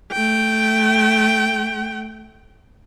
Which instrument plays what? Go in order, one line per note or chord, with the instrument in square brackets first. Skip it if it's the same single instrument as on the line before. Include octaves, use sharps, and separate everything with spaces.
[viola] A3 G5